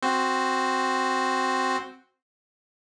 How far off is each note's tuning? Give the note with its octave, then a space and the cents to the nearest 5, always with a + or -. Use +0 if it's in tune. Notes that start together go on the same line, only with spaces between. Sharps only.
C4 +0 F#4 +0 C5 +0